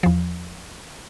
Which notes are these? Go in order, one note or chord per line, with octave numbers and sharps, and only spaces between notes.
E2 F3